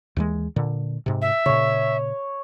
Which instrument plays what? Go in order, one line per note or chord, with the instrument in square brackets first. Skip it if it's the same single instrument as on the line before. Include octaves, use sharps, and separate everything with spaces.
[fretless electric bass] D#2 E3 G#3
A#2 D3
G#2 C3
[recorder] E5
[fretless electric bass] A#2 C#3 [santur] C#5